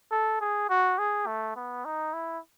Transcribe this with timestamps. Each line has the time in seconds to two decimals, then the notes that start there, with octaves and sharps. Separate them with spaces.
0.12 A4
0.41 G#4
0.69 F#4
0.99 G#4
1.27 A3
1.56 B3
1.85 D#4
2.14 E4